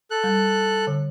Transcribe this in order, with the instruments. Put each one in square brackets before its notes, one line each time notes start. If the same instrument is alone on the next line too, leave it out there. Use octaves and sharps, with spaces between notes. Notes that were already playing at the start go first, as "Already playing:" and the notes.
[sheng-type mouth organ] A4 F#6
[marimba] G3
D3